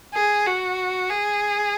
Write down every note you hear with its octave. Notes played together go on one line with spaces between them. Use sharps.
G#4
F#4
G#4